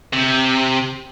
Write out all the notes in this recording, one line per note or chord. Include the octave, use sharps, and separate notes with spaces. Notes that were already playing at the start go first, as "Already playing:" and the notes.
C3